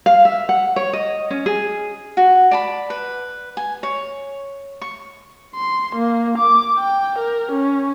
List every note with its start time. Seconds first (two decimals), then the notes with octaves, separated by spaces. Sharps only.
0.06 F5
0.25 E5
0.49 F#5
0.76 C#5
0.93 D#5
1.31 C#4
1.46 G#4
2.17 F#4
2.51 D5 A5 B5
2.90 B4
3.57 G#5
3.83 C#5
4.82 C#6
5.55 C6
5.96 A#3
6.38 D6
6.78 G5
7.19 A#4
7.52 C#4